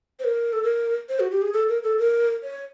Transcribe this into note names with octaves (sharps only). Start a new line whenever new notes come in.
C5
A#4
A4
A#4
C5
F#4
G4
G#4
A4
A#4
A4
A#4
C#5